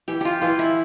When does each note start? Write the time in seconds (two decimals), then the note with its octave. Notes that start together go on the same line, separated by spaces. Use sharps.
0.08 E3 G4
0.21 F4 G4
0.42 E3 F4
0.59 E4